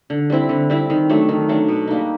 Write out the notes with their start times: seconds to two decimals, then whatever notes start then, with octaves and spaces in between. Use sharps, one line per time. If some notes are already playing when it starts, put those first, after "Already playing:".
0.10 D3
0.30 G3 C4 E4
0.49 D3
0.70 G3 C4 E4
0.90 D#3
1.10 F#3 A3 D4
1.29 D#3
1.49 F#3 A3 D4
1.68 B2
1.88 G3 A#3 D#4